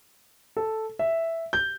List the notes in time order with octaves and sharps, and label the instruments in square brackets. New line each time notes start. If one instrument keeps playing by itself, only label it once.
[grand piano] A4
E5
G6